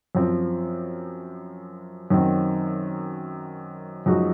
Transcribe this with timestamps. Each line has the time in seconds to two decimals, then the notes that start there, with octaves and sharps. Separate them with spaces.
0.15 F#2 F3 C4
2.10 F#2 D#3 F#3 C4
4.06 F#2 F3 G#3 D#4 F#4